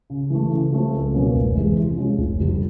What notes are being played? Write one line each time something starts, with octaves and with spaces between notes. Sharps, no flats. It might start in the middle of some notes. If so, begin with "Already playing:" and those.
C#3
E3 A3
C#3
F3 A3 C4
C#2
B2 F#3 A#3 C#4
F1
E2 C3 E3 G#3
C3
F3 G#3 C#4
F1
F2 D3 G3